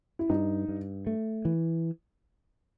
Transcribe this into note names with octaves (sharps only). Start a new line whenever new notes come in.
E4
G2 D#4
G2
A3
E3